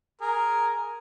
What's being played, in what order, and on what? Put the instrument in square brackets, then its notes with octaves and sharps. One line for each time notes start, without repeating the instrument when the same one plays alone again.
[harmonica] G#4 A#4